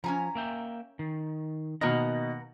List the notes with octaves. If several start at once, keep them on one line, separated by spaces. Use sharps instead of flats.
F3 C#4 G#5 A#5
A#3 E5 G5
D#3
B2 D#3 A#3 B3 D#4 F#5 G5 A#5